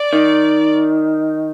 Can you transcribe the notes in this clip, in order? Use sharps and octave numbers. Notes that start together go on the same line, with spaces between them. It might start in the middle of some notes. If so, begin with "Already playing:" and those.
Already playing: D5
D#3